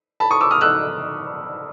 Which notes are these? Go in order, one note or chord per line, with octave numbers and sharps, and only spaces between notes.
A5 B5
C#6 D#6
D6 E6
D#6 F6
E6 F#6